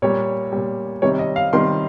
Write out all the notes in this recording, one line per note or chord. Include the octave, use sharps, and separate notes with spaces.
A#2 G3 C#5
A#2 G3
C3 D#3 G3 C#5
D#5
F5
C3 D#3 G3 C6